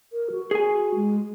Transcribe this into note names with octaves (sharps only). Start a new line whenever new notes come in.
A#4
F#4
G#4 G#5
G#3